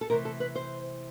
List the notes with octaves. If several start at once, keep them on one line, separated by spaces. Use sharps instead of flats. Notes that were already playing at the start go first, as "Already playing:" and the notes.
A4
C3 E3 A3 A#4
A4
B4
C5